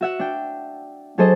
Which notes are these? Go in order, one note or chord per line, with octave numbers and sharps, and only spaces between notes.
F#4 E5 F#5
D4 G5
F#3 D4 G#4 A4 C5 D#5